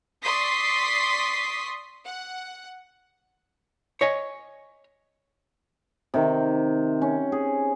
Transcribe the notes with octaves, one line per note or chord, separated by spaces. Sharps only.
D5 C6 C#6 D#6 B6 C7
F#5
C#5 D#5 G#5
C3 D#3
C#4
G#4